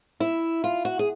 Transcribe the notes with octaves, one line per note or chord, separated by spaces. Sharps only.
E4
F4
F#4
G#4